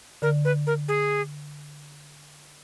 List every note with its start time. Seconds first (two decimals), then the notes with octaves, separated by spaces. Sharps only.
0.22 D3 A#4
0.45 B4
0.67 A#4
0.88 G#4